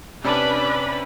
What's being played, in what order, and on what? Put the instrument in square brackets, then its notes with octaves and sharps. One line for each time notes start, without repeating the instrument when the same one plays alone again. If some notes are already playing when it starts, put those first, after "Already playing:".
[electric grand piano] C3 C#4 A5 [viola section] D4 B4 B5 [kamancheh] D5